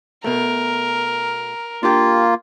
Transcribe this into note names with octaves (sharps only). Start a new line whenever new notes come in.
B2 A3 A#4
A#3 D4 F4 G4